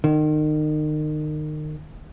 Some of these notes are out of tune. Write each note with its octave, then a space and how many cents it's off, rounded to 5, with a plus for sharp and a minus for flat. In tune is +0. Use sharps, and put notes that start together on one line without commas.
D#3 -30